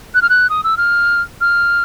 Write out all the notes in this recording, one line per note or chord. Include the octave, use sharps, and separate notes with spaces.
F#6
F6
F#6
D#6
E6
F6
F6